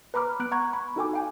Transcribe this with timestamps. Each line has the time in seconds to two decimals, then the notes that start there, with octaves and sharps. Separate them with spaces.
0.14 B4 A#5 B5 D6 F6
0.40 B3 F#6 D7
0.52 F#5 A#5 C#6 F#6 G#6
0.73 B5 C#6
0.96 D#4 F#4 A4 G5 G#5 D6
1.13 F5 G5 G#5